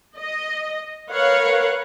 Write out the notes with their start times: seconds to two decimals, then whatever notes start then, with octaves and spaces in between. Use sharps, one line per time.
0.17 D#5
1.09 A#4 B4 C#5 F5 F#5